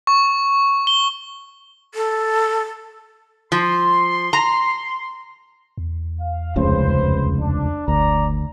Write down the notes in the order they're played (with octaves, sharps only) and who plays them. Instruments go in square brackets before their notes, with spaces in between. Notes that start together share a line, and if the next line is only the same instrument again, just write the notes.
[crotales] C#6
G7
[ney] A4
[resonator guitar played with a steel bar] F3 [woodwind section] C6
[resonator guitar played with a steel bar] A#5
[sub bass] E2
[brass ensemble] F5
[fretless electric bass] F1 C#2 C#3 [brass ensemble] B4 C5
[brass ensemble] D4
[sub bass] F#1 [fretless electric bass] D2 [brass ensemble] D5 A#5